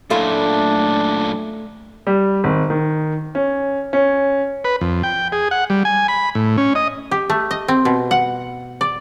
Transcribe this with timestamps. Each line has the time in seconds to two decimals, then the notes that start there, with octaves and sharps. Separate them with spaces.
0.10 F#2 A#2 A3 D4 E4 F4
2.07 G3
2.44 G#1
2.70 D#3
3.35 C#4
3.93 C#4
4.65 B4
4.81 F2
5.03 G5
5.32 G#4
5.51 F#5
5.70 G3
5.85 G#5
6.08 B5
6.35 A2
6.57 C#4
6.75 D#5
7.11 G4
7.30 A3
7.51 D#5
7.68 C4
7.85 B2
8.11 F#5
8.81 D5